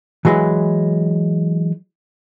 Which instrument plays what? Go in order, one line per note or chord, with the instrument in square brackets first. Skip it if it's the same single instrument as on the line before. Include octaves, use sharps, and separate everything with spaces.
[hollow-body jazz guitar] E3 F#3 G#3 B4